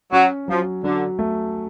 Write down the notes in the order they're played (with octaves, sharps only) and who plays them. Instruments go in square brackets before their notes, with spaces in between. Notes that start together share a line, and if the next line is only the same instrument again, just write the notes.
[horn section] F#3 [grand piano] C#4
[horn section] F3 [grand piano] F#3
[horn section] D3 [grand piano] F#3
[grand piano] A3